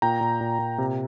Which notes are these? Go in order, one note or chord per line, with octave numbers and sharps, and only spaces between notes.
A#2 G5 A#5
A#2
A#2
A#2
C3